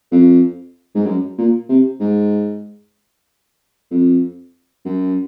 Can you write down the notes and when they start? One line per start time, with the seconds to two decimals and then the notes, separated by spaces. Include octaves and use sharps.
0.12 F2
0.95 G#2
1.06 F#2
1.38 A#2
1.69 C3
2.00 G#2
3.91 F2
4.85 F#2